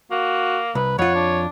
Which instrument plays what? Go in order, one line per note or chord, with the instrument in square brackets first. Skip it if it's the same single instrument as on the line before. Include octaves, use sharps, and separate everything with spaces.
[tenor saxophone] A#3 [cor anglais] F#4
[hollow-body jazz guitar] C2 [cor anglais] B4
[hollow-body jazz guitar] F2 F4 [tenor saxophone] C#5 [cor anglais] F#5
[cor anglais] D4